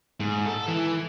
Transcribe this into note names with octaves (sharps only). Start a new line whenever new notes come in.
G#2
A4
E3